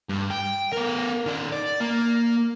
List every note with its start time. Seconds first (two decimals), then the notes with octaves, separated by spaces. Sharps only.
0.09 G2
0.30 G5
0.73 B3 A#4
1.26 D#3 D5
1.52 D5
1.80 A#3